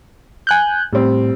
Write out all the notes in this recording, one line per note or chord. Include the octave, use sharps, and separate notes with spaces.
G#5 F#6 G6
A2 G3 C4